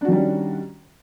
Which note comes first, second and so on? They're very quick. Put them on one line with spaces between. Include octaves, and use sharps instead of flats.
D4 F#4 D#3 G3 C#4